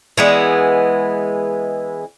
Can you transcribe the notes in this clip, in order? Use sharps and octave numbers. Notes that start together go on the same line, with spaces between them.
E3 G#3 B3